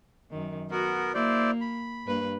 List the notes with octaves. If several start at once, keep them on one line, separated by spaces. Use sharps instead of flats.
F#2 D#3
B3 F#4 A#4
A#3 E4 C5 D5
B5
G2 A#3 B4